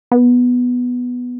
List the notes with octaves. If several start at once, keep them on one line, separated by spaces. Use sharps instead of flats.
B3